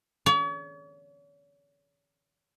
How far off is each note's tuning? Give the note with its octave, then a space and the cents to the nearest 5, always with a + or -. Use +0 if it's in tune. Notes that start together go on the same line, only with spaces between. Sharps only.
C#5 +45